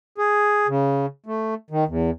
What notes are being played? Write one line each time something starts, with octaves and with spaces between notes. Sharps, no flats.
G#4
C#3
A3
D#3
E2